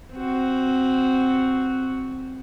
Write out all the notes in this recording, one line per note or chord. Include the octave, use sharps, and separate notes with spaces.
C4 F#4